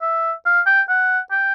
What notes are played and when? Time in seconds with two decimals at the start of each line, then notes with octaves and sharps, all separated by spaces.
0.02 E5
0.45 F5
0.66 G5
0.89 F#5
1.31 G5